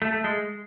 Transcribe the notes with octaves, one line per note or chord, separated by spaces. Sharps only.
A3
A3
G#3